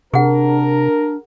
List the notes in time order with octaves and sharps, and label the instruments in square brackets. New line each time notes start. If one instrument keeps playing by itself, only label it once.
[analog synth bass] C3 [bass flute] D4 [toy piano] G#4 F#5 [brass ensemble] A#4